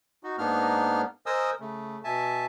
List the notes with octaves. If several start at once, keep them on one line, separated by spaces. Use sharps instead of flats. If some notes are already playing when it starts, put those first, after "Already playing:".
D#4 F#4
G#2 A#3 B3 D4 D#4 F6
A#4 C5 D#5 G#5 D#6 E6
C#3 A3
B2 E5 G#5 A5